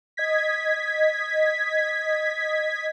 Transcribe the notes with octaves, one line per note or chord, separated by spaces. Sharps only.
D#5 G#6 B6